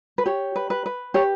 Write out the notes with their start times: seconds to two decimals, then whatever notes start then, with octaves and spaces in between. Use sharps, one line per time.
0.18 B4
0.26 G4 C#5
0.56 B4
0.70 B4
0.86 B4
1.14 G4 C#5